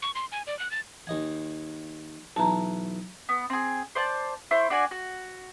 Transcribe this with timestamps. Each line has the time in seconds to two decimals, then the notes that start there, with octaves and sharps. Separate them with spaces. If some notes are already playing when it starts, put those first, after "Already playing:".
0.02 C#6
0.15 C6
0.32 G#5
0.47 D5
0.59 F#6
0.71 A6
1.07 D#2 D#5 G#5
2.36 B1 E3 A5 A#5
3.29 B3
3.50 C4 G#4
3.95 C5 D5 A5
4.51 E4 C5 C#6
4.70 D4 F#4 D5 G#5
4.91 F#4